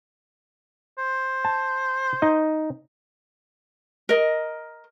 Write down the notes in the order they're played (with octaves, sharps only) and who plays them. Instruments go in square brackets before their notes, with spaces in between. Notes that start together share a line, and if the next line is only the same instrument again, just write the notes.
[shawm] C5
[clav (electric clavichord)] A5
D#4 D#5
[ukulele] A#4 D#5